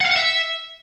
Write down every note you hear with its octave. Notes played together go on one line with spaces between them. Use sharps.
F#5
F5
F#5
E5